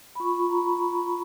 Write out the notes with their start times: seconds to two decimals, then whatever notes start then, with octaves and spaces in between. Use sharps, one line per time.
0.15 B5
0.20 F4 C#6
0.39 F4
0.50 A#5
0.58 F4 B5
0.76 F4
0.95 F4